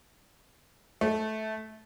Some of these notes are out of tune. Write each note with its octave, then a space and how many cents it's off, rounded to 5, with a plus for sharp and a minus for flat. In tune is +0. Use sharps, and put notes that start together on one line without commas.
A3 -15